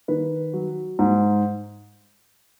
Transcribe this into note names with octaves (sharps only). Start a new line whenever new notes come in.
D#3 B4
F#3
G#2